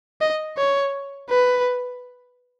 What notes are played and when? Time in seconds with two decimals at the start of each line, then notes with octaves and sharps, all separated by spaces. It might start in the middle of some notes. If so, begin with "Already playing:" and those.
0.21 D#5
0.58 C#5
1.30 B4